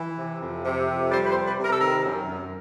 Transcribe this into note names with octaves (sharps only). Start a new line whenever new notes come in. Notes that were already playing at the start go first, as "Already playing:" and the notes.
Already playing: E3
C3
F2
C3
F2
G3 C5
B4
C5
C3
B4
C3
A#4
A4
D#3 A#4
F#2
F#2